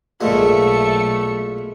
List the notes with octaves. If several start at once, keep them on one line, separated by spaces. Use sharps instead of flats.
B1 A#2 G#3 A3 E5 C#7